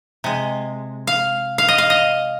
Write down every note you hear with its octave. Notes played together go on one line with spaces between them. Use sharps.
C3 G#3
F5
F5
D#5
F5
D#5